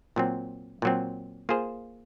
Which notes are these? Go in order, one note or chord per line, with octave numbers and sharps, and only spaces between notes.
A#2 F#3 C4
A#2 F#3 C4
A#3 F4 G#4 C5